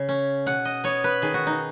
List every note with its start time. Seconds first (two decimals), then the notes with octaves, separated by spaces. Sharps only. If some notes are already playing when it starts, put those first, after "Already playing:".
Already playing: C#3
0.09 C#4
0.46 B2 F#5
0.65 D#5
0.84 B3 C#5
1.04 B4
1.22 D#3 G#4
1.34 F#4
1.47 D#4